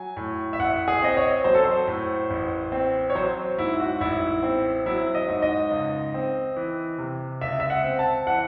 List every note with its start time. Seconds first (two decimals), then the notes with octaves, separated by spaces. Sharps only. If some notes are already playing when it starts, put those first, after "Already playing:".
Already playing: F#3 G#5
0.17 A2
0.53 E5
0.59 A1 F#5
0.88 G#4
1.02 C4 D#5
1.17 C#5
1.44 F#3 C5
1.55 A4
1.63 C5
1.87 A2
2.30 A1
2.72 C4
3.10 C#5
3.15 F#3 C5
3.58 G#2 E4
3.80 F#4
4.00 A1 E4
4.43 C4
4.86 F#3 E4
5.15 D#5
5.28 G#2
5.42 D#5
5.71 C#2
6.14 C4
6.56 E3
6.98 C3
7.41 C#2 E5
7.60 E5
7.70 F#5
7.84 C4
7.99 A5
8.27 E3 F#5